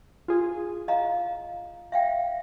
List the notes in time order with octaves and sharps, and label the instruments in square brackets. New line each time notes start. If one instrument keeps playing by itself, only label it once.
[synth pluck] F4 G#4
[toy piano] D#5 F5 A#5
E5 F5 G5